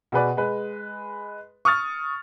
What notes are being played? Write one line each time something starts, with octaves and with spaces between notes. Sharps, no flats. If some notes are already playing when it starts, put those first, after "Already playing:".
B2 G#4 B4 D5
G#3 B4
C#6 D#6 F6 A6